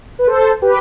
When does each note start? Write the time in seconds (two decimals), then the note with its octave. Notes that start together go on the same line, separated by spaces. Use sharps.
0.19 B4
0.27 A4 C5
0.62 G4 B4